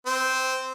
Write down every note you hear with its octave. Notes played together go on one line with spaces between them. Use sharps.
C4